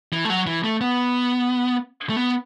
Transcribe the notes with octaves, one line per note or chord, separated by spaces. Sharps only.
E3
A3
F#3
E3
A3
B3
A3
B3